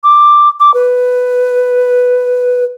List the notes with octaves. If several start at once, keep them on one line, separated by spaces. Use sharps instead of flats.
D6
D6
B4